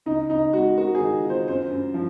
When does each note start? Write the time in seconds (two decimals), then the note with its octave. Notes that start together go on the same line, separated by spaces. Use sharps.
0.06 C#2 D#4
0.30 C#2 D#4
0.53 G#3 F#4
0.77 F#4 A#4
0.95 G#4
1.00 D#3
1.24 F4
1.30 C5
1.48 F#2 C5
1.71 F#2
1.94 F3